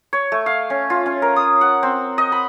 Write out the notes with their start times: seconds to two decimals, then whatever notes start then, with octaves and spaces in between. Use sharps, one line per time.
0.13 C#5
0.32 A3
0.46 F5
0.70 C#4
0.90 F4
1.06 C#4
1.22 A#4
1.36 D#6
1.61 F#5
1.83 C4
2.18 D#5
2.32 B5